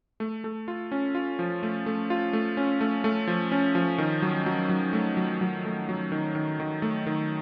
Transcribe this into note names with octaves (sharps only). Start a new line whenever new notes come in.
A3
A3
F4
C#4
F4
F3
A3
A3
F4
A3
C#4
A3
A3
F3
C#4
F3
D#3
F#3
F#3
F#3
A3
F#3
F#3
A3
F#3
D#3
D#3
D#3
A3
D#3